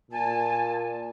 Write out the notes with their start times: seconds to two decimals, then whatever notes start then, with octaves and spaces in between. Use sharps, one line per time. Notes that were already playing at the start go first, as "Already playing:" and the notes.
0.11 A#2 G#5 A5